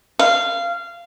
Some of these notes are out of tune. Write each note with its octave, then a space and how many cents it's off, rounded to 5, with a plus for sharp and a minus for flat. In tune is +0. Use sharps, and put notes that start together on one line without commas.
F5 -20